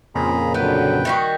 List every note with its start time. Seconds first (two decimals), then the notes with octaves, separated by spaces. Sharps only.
0.15 F2 A#2 C#3 G#4 A#5 B5
0.54 D3 F#3 B3 B4 G5
1.05 D#3 G3 F#4